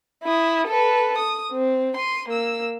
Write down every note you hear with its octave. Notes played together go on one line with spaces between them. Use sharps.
E4 D#6
A4 B4
D#6
C4
C6 D#7
A#3 E6